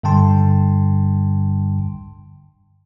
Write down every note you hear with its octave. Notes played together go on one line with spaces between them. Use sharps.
G2 D3 G3 G5 A5 C6